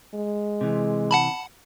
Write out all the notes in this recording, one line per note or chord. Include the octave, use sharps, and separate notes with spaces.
G#3
C3 E3
F#5 A5 B5